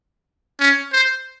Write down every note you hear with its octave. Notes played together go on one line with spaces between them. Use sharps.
C#4
C5